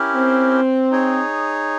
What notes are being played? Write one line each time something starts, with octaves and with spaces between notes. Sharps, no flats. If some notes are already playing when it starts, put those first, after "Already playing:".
Already playing: C#4 E4 G4 A#4
C4
D#4 G#4 C#5